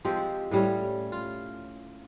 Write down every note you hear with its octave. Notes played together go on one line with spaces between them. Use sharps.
F3 G#3 C4 G4
A2 G3 C#4
F4